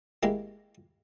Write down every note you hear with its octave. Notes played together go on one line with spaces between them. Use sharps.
G#3 A#3 E4 G4